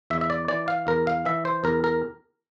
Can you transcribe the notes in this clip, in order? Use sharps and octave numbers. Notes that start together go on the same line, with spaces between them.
E2 E5
E5
D5
E3 D5
F5
E2 A#4
F5
E3 E5
C5
E2 A#4
A#4